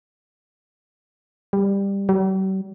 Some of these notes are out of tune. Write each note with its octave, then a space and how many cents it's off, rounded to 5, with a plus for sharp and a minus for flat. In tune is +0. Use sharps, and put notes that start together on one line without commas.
G3 +15
G3 -45